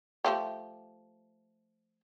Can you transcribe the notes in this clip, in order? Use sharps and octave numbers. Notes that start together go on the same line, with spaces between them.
F3 A3 G4